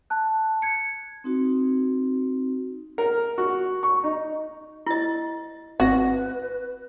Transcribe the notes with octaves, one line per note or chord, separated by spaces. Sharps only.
A5 F#6
G#6 C#7
C4 D#4 F#4
A#4
F#4
C#6
D#4
E4 D#5
G1 C4 F#4 B4 A#6